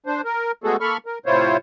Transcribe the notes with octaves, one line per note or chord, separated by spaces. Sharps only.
D4 C5
A#4
G#3 A3 B3 F#4 G#4 A4
A#3 A4 B5 C#6 F6
A#4
A2 C3 E4 F4 C5 C#5